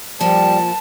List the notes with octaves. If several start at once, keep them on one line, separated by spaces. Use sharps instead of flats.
A#2 F3 G3 A5